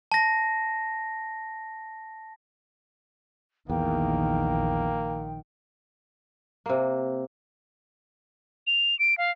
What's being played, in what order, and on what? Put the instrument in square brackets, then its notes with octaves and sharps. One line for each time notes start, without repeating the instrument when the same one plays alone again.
[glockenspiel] A5 A#6
[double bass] A#1 D#3 [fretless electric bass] E2 [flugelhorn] A#3 [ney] G5
[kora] C3 A#3
[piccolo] F7
D7
F5